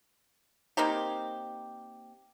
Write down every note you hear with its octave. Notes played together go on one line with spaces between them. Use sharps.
A#3 C4 D#4 G4